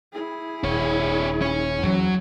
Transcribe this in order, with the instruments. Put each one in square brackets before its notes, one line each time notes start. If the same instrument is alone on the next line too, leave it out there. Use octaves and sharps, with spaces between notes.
[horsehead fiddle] E4 G#4
[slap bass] D#1 [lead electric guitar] D4 C#5
[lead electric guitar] C#4 C#5
[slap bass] E2 E3 C#4 [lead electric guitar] F#3